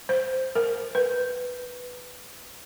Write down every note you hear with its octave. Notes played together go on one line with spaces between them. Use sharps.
C5
A#4
B4